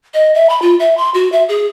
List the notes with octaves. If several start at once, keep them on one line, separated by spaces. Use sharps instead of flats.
D#5
E5
B5
F4
E5
C6
F#4
E5
G#4